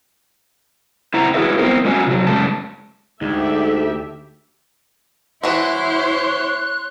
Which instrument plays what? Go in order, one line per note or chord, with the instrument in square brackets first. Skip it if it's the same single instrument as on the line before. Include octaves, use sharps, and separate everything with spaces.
[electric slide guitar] C4 E4 C5 F#5 A#5
E4 F#4 G#4 A4 B4 E5
B3 C4 E4 A#4 C5
G#3 C#4 D4 F4 F#4 G#5
C3 F#3
F#2 C#3 G#3 A5
[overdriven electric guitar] D2 [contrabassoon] G#2 [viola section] G4 A4 E5
[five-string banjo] E3 F#4 [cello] E4 C5 [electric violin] C#5 C6 [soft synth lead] F#6